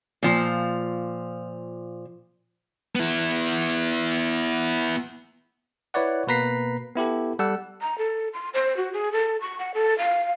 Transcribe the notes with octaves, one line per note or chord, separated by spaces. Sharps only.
A#2 F3
B3 E4
E4 B4 C#5 D5 F#5
B2 A#3 B4 A#5 B6 C7
B3 E4 G4 A4
G3 A4 F#5 E6
A#5
A4
C6
C5
F#4
G#4
A4
C#6
F#5
A4
F5